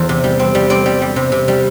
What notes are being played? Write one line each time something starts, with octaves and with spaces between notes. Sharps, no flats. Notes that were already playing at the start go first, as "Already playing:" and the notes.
Already playing: E2 C5
C3
G3
C4
G3
C4 D5
G3
G3
C3
C3
G3